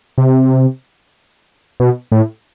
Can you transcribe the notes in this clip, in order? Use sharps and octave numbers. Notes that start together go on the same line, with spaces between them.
C3
B2
A2